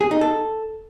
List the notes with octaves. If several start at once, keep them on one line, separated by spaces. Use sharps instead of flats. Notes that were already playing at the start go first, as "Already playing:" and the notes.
G#4
D#4
A4